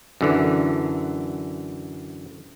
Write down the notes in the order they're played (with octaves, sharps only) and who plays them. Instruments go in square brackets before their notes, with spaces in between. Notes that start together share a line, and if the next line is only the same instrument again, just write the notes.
[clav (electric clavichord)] F#2 D3 E3